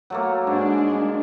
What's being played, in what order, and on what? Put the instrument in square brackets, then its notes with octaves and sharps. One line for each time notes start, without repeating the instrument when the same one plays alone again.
[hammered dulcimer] F#3 A3 A#3
[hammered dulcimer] G#2 [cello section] G#3 D4